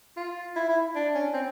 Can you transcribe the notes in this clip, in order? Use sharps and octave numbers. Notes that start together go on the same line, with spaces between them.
F4
E4
E4
D4
C#4
C4